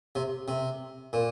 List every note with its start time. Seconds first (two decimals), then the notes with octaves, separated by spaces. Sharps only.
0.15 C3
0.48 C3
1.13 A#2